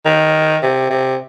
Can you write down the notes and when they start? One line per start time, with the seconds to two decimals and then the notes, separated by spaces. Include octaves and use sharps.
0.05 D#3
0.63 C3
0.90 C3